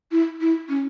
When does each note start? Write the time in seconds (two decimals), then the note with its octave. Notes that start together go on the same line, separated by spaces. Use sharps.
0.12 E4
0.41 E4
0.69 C#4